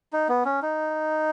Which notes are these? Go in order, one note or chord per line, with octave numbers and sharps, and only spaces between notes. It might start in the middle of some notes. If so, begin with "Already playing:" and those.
D#4
B3
C#4
D#4